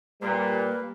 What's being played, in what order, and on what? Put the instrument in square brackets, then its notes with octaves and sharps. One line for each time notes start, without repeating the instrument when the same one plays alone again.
[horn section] A#2 [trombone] G3 [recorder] A#3 [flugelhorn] B4